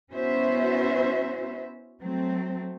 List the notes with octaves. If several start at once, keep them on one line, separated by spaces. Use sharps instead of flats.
B3 C#4 E4 F#4 C5 E5
F#3 A3 C4